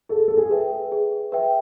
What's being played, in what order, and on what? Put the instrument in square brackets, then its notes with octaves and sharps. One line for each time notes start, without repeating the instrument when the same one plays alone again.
[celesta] G#4 [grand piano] A4
[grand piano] A4
G#4
[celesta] B4 E5 G5
G#4
B4 E5 G5